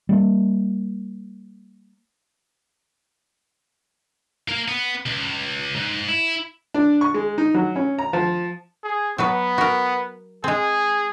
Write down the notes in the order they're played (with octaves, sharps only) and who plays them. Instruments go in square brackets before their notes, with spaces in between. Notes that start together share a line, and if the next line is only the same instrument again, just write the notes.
[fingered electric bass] G3 G#3 A#3
[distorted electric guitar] A#3 A#4
B3
C#2
G#2
E4
[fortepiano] D4
C#6
G#3
D#4
F#3
C#4
A#5
F3
[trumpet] G#4
[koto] F#3 F#4 B4 [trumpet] B3
[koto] F#4 A#4
[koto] G#3 C4 [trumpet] G#4